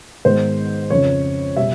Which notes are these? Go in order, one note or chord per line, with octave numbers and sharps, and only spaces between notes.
G#2 D#3 G#3 B3 C5
F2 C#3 F3 C#5
B2 G3 E5